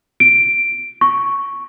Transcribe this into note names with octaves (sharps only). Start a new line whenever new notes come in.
D7
C#6